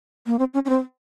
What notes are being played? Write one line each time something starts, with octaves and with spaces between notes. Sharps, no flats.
A#3
C4
C#4
C#4
C4